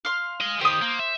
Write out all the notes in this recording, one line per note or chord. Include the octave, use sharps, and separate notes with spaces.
F5 C6
G#4 D#5
D#3 G4 C5 D#6
A#3
E5